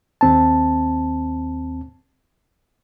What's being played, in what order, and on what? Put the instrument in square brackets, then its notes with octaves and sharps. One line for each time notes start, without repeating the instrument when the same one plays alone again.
[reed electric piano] D#2 C4 A5